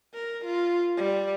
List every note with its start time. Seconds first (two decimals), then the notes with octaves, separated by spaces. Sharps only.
0.14 A#4
0.45 F4
0.97 G3